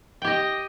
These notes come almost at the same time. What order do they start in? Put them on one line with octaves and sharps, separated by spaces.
G5 G4 D#5